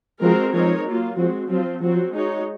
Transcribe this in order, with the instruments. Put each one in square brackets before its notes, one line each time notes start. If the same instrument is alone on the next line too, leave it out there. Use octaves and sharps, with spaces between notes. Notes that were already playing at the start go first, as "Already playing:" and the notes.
[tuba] F3 [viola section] G#3 C4 F#4 A#4
[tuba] F3 [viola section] G#3 C4 D#4 A#4 C#5
[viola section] F#3 A#3 F4
[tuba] F3 [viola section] G#3 C4 F#4
[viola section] F3 C4 F4 [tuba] F#3
[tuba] F3 [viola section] F#3 C4 F#4
[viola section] G#3 D#4 F#4 C#5